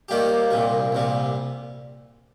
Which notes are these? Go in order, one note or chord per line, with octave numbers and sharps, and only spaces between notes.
D#2 D#3 G3 A#3 G4
C2 A#2 G3
C2 A#2 G3